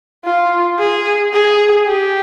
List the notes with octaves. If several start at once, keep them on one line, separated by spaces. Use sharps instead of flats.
F4
G#4
G#4
G4